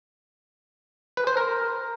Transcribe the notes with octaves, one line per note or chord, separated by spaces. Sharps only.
B4
C5
A#4